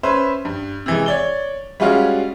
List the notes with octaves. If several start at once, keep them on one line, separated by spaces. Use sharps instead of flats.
C#4 B4 C5 E5
G2
C3 E3 G#3
C#5 D5 G7
G3 G#3 C#4 F4 F#4